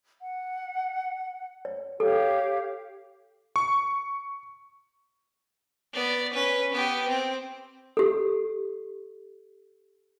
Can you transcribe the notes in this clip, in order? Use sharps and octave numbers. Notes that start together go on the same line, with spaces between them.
F#5
C#5
G4 A4 C#5 F5
C#6
B3 D5
C#4 B4
B3 G4
C4
G4 A4